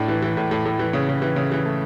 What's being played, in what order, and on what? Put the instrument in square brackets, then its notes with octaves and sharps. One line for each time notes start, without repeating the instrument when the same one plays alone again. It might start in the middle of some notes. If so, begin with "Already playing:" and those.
Already playing: [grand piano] A2 D4
E3
E3
A2
A2
A2
E3
C#3
C#3
E3
C#3
E3
A3